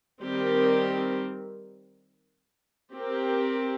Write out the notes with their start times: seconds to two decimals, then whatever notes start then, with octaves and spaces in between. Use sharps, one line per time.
0.22 D#3 G3 C4 G4 A#4
2.94 C4 G4 A#4